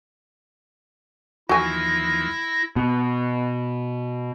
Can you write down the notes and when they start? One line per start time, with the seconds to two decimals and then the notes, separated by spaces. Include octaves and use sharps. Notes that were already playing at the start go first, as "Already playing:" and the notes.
1.49 D#2 E3 F3 E4 F#4 G#5 A#6
2.76 B2